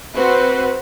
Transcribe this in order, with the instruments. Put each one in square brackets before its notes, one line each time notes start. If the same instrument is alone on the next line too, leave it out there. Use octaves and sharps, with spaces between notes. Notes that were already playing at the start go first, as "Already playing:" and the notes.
[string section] C4 F#4 C5 [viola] B4